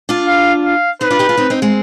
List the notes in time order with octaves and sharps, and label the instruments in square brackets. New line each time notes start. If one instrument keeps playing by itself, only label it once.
[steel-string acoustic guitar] D4 F4
[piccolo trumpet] F5
F5
[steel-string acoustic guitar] C4 D#4 [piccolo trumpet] B4
[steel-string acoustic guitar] D4 F4
D#4 G4
F4 G#4
C4 D#4
C4 D#4
G#3 C4